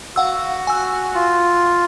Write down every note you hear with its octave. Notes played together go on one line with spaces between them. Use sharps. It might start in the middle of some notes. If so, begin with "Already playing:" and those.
F#4 F5 F#5 E6
G#5 E6
F4